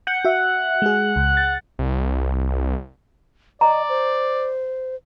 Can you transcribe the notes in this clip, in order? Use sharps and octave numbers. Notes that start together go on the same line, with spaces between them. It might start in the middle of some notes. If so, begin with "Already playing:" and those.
F#5 G6
F#4 E5
G#3 G#4
C#2
A6
C2
D5 D#5 A#5
C5